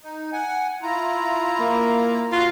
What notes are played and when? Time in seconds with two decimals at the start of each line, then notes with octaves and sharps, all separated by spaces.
0.01 D#4
0.33 F#5 G#5
0.82 E4 F4 A#5
1.60 A#3
2.32 F2 D3 F4 F#4